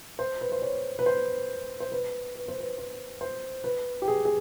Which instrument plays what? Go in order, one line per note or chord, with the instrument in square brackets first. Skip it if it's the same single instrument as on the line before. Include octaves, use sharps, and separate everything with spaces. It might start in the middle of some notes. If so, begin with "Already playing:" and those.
[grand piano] C5
B4
C5
C#5
B4
C5
C5
B4
B4
C5
B4
C5
C5
B4
G4
G#4
G#4